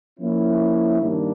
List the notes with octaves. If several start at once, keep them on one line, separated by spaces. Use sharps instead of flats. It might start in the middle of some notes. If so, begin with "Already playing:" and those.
F3 A#3 C#4 E4
G2 D#3 G3 A#3 D4